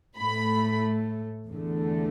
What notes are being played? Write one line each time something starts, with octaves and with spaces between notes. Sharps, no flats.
A2 A3 B5
E2 D3 A3